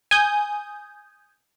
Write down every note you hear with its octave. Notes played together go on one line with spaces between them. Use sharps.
G#5 D#6 G6